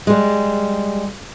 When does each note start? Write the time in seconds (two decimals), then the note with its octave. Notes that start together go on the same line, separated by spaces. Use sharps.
0.07 G3 G#3